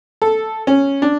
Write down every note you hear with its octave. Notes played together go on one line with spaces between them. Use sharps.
A4
C#4
D4